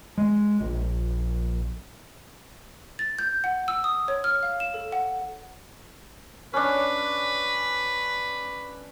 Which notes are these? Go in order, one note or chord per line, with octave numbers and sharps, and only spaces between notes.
G#3
A#1
A6
G6
F#5
E6
D#6
C#5
F6
F5
E7
A4
F#5
C#4 D4 B4